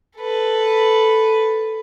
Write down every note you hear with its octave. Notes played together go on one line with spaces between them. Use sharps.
A4 B4